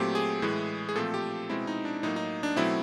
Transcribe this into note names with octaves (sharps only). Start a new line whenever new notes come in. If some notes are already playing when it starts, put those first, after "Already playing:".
Already playing: A#2 F#3 A3 C4 G4
G#4
A2 E3 G#3
G#4
A#2 F3 A3 C4 A4
G4
B2 G#3 C4 E4
D#4
D4
A2 F#3 A#3 D#4
D#4
D4
B2 F#3 A3 C4 E4